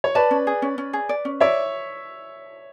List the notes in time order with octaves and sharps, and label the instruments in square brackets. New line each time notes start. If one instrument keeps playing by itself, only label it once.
[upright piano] C#5
[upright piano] B4 D5 [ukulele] A5
[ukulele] C#4
G#4
C#4
C#4
G#4
D5
C#4
[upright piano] C#5 E5 [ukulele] D5